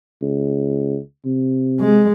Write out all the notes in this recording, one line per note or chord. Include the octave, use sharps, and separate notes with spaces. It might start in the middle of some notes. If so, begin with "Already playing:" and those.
C#2
C3
G#3